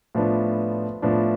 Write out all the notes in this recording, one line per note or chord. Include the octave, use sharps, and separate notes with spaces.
A2 F3 B3 D4
A2 F3 B3 D4